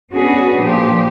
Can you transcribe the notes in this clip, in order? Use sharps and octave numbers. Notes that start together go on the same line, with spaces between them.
B3 C#4 D4 F#4 G#4 B4
A#2 F3 G4